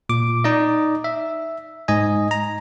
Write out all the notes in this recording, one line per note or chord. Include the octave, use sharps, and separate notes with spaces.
A#2 D6
D#4 D5 D#5
E5
G#2 D#5 G#5
A#5